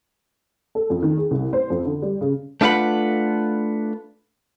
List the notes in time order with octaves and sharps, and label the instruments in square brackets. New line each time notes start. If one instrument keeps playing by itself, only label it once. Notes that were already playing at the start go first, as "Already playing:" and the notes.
[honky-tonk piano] A4
F2
D#3
G#4
C2
C5
F2
D3
G3
C#3
[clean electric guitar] A3 D4 F4 B4 F#5 B5